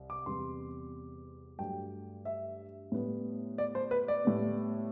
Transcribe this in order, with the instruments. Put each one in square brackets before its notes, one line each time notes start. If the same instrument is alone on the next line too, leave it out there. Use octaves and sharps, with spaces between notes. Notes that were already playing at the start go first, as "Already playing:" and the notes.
Already playing: [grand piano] C2
D6
E2 C3 G3 B3 C6
G2 F#3 A3 G5
E5
A2 G3 B3
D5
C5
B4
D5
A2 G3 B3